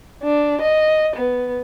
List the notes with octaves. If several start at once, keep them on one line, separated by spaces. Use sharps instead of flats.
D4
D#5
B3